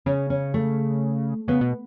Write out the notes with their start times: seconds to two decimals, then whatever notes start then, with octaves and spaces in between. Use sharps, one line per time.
0.06 C#3 C#4
0.30 C#4
0.54 A3
1.48 C#3 B3
1.61 B2